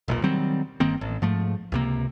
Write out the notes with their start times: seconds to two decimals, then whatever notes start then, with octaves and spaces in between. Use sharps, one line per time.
0.08 E1 B1 A#2
0.23 D#3 F#3 G3 C4
0.80 G1 D#3 A#3 C4
1.01 A1
1.22 G#2 F3 A3
1.72 C#2 C3 A#3